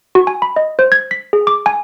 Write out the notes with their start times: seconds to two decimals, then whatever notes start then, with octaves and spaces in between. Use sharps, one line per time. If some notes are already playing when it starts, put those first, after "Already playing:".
0.15 F#4
0.27 G#5
0.42 B5
0.56 D#5
0.79 C5
0.92 G#6
1.11 B6
1.33 G#4
1.47 D6
1.66 G#5